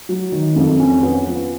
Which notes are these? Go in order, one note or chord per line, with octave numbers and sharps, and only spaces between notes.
F#3
D#3
F2
C#4
B3
F3